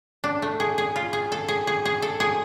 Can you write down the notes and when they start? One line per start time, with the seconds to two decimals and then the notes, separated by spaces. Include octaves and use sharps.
0.24 D4
0.42 A3
0.60 G#4
0.78 G#4
0.96 F4
1.13 G#4
1.32 A4
1.48 G#4
1.67 G#4
1.85 G#4
2.02 A4
2.20 G#4